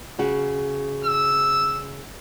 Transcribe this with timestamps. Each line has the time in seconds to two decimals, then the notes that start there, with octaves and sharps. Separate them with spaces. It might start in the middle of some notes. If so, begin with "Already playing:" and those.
0.19 C#3 F#4
1.05 E6